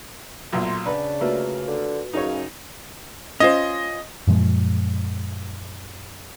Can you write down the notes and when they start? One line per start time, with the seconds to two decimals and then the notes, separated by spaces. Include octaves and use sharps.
0.52 B1 A#2 A3 C6
0.86 C#3 D4 B4
1.21 A3 A#3 F4 F#4 B4
1.67 D3
2.13 F#2 C#3 D#4 C#5
3.40 C#4 F4 C5 D#5
4.27 F#2 A#2 F3 G#3